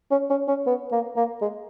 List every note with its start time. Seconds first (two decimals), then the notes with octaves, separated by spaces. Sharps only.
0.11 C#4
0.30 C#4
0.48 C#4
0.67 B3
0.92 A#3
1.16 A#3
1.42 G#3